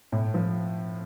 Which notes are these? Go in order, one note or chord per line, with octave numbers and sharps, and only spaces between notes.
A2
F3